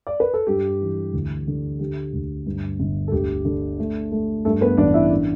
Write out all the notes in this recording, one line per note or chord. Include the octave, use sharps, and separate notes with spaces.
D5
B4
A4
G2 G4
E3
D2
D3
D3 G4
D2
G2
G1
A4
D2 G4
D3
A3
A3
G2 A3 A4
B3 B4
A1 D4 D5
E4 E5
D4